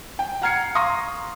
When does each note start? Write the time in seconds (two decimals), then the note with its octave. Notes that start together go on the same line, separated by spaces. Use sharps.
0.19 G5
0.42 F#5 A#5 F6 G#6 C7 C#7
0.75 F5 A#5 C6 C#6 D#6 A#6